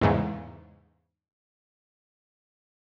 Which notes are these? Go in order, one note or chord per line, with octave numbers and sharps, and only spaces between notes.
E2 G#2 C#3